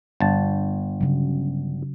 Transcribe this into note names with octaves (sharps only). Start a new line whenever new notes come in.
G1 A5
C#3 F#3